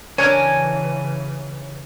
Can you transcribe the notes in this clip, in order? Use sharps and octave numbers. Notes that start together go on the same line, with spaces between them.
C#3 E3 C#4 D4 A#4 C#5 G#5